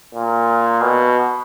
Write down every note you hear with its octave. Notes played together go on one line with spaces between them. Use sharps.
A#2
B2